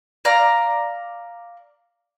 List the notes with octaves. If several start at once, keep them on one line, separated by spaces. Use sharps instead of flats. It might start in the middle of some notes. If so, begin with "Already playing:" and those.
D5 F5 A#5